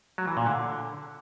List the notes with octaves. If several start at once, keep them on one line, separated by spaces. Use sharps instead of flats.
F#3
E3
A#2
D3